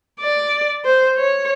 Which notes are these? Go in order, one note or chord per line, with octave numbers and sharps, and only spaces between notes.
D5
C5
C#5